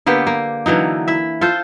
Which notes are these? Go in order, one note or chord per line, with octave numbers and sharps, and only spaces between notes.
D3 A#3 B3 G4
A#3
D3 E3 F#3 D#4
E4 E5
F4 A4 C5